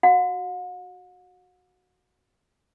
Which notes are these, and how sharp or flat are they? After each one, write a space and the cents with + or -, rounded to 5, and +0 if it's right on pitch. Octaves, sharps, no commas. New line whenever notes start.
F#4 +0 F#5 -45